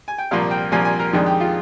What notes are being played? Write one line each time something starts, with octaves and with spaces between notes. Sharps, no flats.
G#5
G5
C2 A#2 F3 A#3 F5
G5
C2 A#2 F3 A#3 G#5
G#5
A#4
F2 D#3 G#3 D4 G4
G4
F4